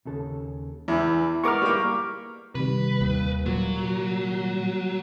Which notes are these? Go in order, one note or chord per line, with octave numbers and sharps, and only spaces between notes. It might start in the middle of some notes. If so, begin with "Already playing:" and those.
D#2 C#3 A4
E2 E3 E4
G#3 B3 A#4 C#6 D6 F6
G3 A#3
C3 D#3 G3 B4
D#2
A#2 F#3